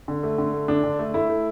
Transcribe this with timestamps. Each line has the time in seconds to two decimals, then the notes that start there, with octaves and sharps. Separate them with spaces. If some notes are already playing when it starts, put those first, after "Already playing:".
0.08 D3
0.23 A3
0.38 D3
0.53 A3
0.68 D3 D4
0.84 D3
0.99 A3
1.14 A3 E4
1.29 A3